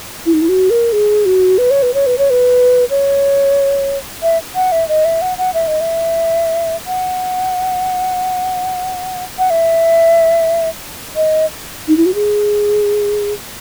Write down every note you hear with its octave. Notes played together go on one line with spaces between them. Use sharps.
E4
D#4
E4
F#4
A#4
G#4
F#4
B4
C#5
B4
C#5
B4
C#5
B4
C#5
E5
F#5
E5
D#5
E5
F#5
F#5
E5
D#5
E5
F#5
F#5
E5
D#5
D#4
E4
F#4
G#4